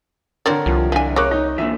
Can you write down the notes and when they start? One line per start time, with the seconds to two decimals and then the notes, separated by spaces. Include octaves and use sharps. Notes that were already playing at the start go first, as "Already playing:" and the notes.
0.46 D3 C4 D4 A#4 C#5 D5
0.66 C2 F3
0.92 E3 F3 D4 G#5
1.16 C#3 A#3 C#5 C#6 D6 F#6
1.31 D#4
1.58 A#2 D3 E3 E5